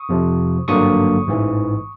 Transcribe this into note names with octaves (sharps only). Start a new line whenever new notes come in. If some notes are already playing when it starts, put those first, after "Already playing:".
Already playing: C#6 D#6
F2 C3 F3
G#1 G2 D3 F#3 A#3 C#6 D#6
A1 G#2 E3